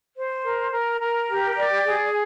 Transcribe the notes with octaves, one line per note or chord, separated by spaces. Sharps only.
C5
A#4
A#4
A#4
G4
D5
G#4